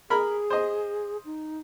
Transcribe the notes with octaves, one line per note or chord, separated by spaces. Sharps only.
G#4 A#4 B5
C5 D#5
D#4